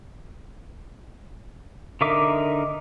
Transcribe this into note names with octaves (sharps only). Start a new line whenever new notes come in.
D3 D#4 A#4 E5 D6